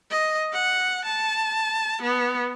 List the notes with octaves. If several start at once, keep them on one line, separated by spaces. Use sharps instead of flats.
D#5
F#5
A5
B3